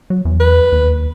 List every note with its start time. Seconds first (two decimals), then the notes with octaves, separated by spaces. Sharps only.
0.10 F#3
0.25 E2
0.40 B4
0.72 D#2